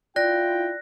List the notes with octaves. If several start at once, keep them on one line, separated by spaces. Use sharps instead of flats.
E4 F4 D5 G5 F#6 A#6